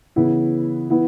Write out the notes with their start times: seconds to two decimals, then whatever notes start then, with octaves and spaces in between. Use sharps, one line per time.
0.16 C#3 E3 B3 E4
0.90 E3 B3 E4